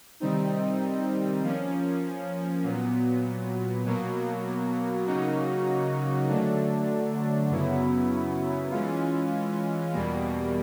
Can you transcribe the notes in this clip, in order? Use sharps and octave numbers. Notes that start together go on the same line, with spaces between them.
C3 D#3 G3 C4 D#4
F3 A#3 C#4
A#2 F#3 B3
B2 F#3 A#3
C#3 F#3 A#3 D#4 F#4
D3 F#3 A3 D4
F#2 C#3 F#3 B3 E4
E3 G#3 C#4 F4
E2 B2 G3 A#3